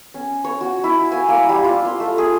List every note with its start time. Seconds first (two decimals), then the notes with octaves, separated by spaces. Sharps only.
0.14 C#4
0.44 C#5
0.61 F#4
0.84 E4
1.12 G#5
1.28 A#3
1.49 G3
1.64 F4
1.85 C6
2.00 A3
2.18 G#4